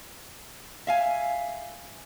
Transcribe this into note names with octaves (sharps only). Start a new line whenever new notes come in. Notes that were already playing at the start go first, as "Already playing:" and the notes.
E5 F5 G#5